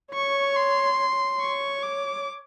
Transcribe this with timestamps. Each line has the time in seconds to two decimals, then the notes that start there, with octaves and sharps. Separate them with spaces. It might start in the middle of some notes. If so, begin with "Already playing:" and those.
0.14 C#5 C#6
0.57 C6
1.40 C#5 C#6
1.83 D6